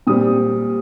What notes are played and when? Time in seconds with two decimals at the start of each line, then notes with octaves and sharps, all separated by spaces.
0.07 A#2 G3 C4 D#6